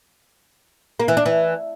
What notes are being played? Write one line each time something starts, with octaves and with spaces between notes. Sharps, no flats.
A#3
E3
D4
E3